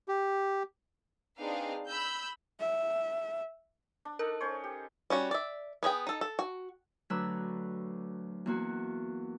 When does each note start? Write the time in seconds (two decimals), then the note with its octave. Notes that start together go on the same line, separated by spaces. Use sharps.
0.08 G4
1.38 C4 D4 D#4 G#4 B4 F5
1.87 B5 E6 G6
2.60 E5
4.05 D4
4.19 D#4 A4 A#4
4.40 C#4 C5 C#5
4.64 G4
5.10 G3 C#4 F#4
5.31 D5 E5
5.83 B3 G#4 D#5 G5
6.07 D#4 A4
6.21 A4
6.39 F#4
7.10 D2 F#3 D4 B4 A#5 E6
8.46 E2 A#3 F#4